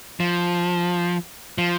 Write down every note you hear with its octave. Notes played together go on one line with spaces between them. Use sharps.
F3
F3